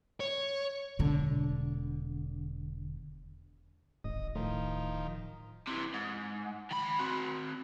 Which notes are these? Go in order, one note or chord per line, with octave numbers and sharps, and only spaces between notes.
C#5
E1 D3
D1 G#1 D#5
A2 D#3 F3
C3 E3
G#2
D#3 B5
C4 F#4